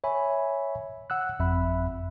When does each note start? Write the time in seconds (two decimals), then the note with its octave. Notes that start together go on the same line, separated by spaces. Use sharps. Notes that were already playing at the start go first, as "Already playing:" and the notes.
0.04 C#5 E5 G#5 B5
1.10 F#5 E6 F#6
1.39 G1 F2 E5 B5 F#6